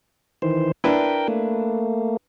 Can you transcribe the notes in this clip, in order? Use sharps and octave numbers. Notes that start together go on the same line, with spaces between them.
D#3 E3 C5
D4 E4 A#4 B4 G5
A3 A#3